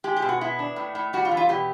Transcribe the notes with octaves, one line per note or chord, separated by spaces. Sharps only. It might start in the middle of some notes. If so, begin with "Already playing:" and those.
G#3 G4
G4
B2
F#4
B3 E4
D4
A2
A2
G3 F#4
F4
E3
F4
B2 G4